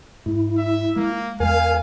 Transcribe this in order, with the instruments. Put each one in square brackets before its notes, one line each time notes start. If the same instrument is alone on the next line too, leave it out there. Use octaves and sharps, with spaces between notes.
[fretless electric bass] G#2 [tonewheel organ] E4
[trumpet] E5
[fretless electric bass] G#3 [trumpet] A#3
[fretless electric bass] E2 G#3 [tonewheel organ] A#4 G#5 [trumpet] F5